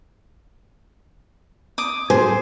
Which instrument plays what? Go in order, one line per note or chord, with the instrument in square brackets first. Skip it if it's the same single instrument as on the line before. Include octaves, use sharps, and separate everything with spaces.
[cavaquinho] D6 D#6
[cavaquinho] G#4 [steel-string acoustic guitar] C5